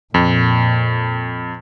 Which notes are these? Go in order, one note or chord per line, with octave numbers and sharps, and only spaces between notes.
F2 A#2